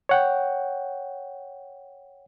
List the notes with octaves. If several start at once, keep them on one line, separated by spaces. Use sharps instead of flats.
C#5 F#5 G5